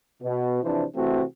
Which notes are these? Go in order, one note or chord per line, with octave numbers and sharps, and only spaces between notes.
B2
C3 E3 F3 D4 C5
C3 E3 A3 C4 F#4